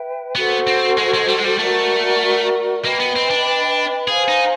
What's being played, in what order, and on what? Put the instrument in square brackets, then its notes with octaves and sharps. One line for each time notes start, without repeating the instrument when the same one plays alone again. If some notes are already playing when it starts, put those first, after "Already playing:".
Already playing: [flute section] B4 E5 G5
[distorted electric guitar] B3 [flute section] F#4 A4 C5
[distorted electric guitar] C4
G#3
G#3
G3
G#3
G3
[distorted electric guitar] A3 [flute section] F#4 A#4 D5
[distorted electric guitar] A#3 [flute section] B4 D#5 G5 B5
[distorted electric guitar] B3
C4
D4
[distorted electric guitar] G#4 [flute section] C5 F5 G#5
[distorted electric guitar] D#4